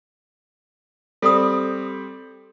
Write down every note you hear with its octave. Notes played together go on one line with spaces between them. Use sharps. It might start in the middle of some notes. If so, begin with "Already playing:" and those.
G3 C4 A4 D#6